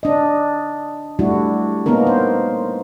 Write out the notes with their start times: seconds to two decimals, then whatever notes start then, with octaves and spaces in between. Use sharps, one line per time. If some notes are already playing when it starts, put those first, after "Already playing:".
0.03 D4 D#5
1.19 G3 A3 D4 E4 F#4
1.86 A#3 B3 C#4 D#4 A#4
2.07 C5